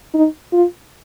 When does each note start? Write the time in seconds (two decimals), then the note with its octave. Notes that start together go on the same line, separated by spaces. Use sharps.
0.14 D#4
0.52 F4